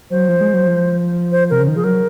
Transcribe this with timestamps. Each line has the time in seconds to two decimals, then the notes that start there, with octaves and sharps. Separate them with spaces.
0.10 F#3 C5
0.29 F3
0.41 G#3
0.54 F#3
0.67 F3
1.32 C5
1.50 C3 A#4
1.60 C#3
1.68 D#3
1.75 F3 G#4
1.84 F#3 A#4